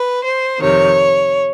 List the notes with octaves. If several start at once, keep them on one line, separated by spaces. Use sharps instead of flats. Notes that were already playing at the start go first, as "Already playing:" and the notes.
Already playing: B4
C5
F2 C3 D#3 C#5